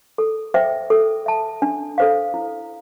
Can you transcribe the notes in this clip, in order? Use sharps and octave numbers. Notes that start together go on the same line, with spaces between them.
A4
C5 E5 G5
A4
E5 A5
D4
A4 C5 F5
E4